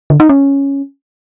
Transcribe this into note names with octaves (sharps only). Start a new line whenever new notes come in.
D3
D#4
C#4